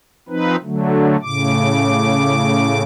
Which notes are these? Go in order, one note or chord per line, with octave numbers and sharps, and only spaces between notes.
F3 C4 D#4 B4
D3 F#3 A3
A2 C#3 D6